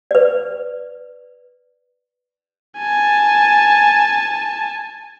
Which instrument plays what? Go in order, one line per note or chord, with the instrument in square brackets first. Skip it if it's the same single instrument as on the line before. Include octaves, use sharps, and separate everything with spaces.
[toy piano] B4 D5
[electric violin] G#5 A5